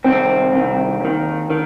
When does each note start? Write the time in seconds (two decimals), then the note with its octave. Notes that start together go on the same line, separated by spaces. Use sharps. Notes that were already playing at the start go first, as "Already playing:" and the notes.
0.04 C2 C3 D#3 C4
0.53 C2 C3 D#3
1.00 D#2 D#3
1.50 D#3